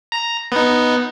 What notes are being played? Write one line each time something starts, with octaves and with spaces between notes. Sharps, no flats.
A#5
B3 D#4